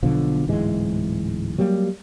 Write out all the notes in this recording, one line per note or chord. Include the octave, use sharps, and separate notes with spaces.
B1 B2 D3 F3
D1 G#2 E3 G#3
F#3 G3 A#3